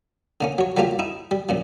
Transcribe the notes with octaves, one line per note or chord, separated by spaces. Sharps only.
D3 A#3 C#4
F#3 C#5
F#3 G3 A3 A#3 F4 G4
D#4 E4
G3
F#2 A#2 F3